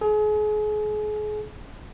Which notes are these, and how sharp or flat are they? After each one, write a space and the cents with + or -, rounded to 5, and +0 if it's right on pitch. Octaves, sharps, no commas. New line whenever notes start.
G#4 +35